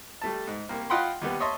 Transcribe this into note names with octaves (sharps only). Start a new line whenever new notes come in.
G3 A3 A5
G#2
C2 A#3
F4 D#5 F#5 G5 B5 C6
D#2 G3 B3
C#5 D#5 E5 A5 C6